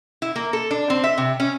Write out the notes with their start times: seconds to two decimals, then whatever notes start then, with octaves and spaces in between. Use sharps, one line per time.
0.22 E4
0.36 A#3
0.53 A4
0.71 D4
0.90 C4
1.04 E5
1.18 C3
1.40 C#4